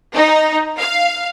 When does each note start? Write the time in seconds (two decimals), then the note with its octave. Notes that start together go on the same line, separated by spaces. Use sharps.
0.15 D#4
0.79 F5